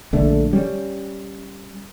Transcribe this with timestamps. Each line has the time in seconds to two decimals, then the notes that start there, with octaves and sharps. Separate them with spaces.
0.13 A#1 D3 A3
0.53 G3 C#4